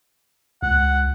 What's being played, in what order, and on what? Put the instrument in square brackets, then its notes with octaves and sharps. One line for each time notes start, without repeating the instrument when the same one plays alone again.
[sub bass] C#2 [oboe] F#5